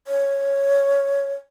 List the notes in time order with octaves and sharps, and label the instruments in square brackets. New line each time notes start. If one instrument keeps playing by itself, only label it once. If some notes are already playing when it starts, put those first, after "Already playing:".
[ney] C#5